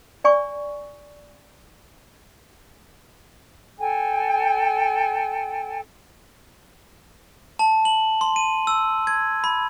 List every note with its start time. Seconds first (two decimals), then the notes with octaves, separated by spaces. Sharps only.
0.24 D5 G#5 C#6
3.79 A4 G5 G#5
7.59 A5
7.85 F#7
8.21 C6
8.36 D#7
8.67 E6
9.07 G#6
9.44 B5